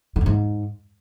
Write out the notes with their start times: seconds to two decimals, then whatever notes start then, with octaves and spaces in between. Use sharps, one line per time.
0.16 D3
0.21 E2
0.26 G#2